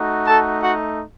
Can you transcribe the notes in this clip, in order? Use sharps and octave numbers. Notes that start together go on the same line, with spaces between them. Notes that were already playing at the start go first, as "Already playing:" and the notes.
Already playing: A3 D#4 F#4
A4 A5
F#4 F#5